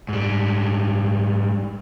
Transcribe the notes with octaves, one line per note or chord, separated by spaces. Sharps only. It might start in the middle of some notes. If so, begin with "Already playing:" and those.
G#2 G3